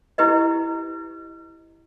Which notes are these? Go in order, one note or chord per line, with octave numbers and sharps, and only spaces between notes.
E4 G4 B4 D#5